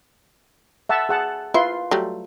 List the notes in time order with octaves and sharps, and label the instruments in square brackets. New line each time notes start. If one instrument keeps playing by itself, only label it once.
[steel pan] E5 F#5 A5
G#4 F#5 A5
[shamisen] E4 [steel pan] F4 B4 C6
[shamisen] F#3 G3 A3